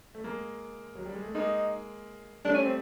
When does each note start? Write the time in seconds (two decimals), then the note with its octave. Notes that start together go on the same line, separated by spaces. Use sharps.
0.15 A3
0.24 G#3 A#3
0.96 F#3
1.06 G3
1.15 G#3
1.24 A3
1.35 G#3 A#3 D#4
2.45 G3 A3 D4
2.54 C#4
2.63 C4